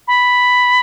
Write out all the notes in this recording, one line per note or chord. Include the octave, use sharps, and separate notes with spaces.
B5